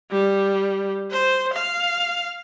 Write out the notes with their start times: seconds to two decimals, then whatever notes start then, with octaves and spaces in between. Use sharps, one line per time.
0.11 G3
1.11 C5
1.54 F5